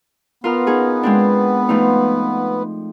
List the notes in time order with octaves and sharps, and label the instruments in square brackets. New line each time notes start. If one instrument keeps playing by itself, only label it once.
[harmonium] B3 [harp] F4 A#4 F6
[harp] C#4 D#4 G#4
G#3 C4 D4
F3 A3 D#4